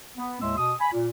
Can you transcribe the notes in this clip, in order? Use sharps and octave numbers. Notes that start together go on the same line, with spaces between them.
B3
D#2 A2 G#3 E5 C6 E6
B2 D#6
G#5 B5
A#2